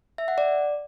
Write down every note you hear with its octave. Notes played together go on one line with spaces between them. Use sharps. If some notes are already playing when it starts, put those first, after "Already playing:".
E5
F#5
D5